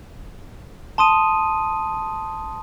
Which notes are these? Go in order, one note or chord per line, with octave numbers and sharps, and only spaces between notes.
A5 C6 D#6 D#7